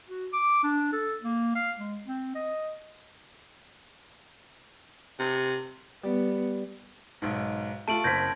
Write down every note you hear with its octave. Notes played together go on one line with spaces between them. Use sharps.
F#4
D6
D4
A4
A#3
F5
G#3
C4
D#5
C3
G3 B3
B1 G#2
A3 F4 A5 D7 F#7
F#1 C4 G6 G#6 A#6 B6